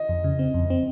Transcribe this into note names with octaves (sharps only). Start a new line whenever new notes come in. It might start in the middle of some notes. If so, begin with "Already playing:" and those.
Already playing: D#5
F2
C#3
C4
F2
C4